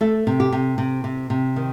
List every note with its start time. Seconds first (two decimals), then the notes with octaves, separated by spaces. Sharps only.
0.01 A3 A4
0.27 C3
0.40 G4
0.52 C3
0.78 C3
1.04 C3
1.30 C3
1.56 D#3